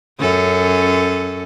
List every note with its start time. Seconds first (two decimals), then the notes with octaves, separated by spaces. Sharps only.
0.20 F#2 C#4 A4